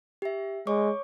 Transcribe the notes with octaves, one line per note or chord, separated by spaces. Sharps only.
G4 E5
G#3 C#5 C#6 D6